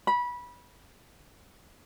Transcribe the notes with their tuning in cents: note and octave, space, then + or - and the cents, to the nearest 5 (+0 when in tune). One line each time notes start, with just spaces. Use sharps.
B5 -20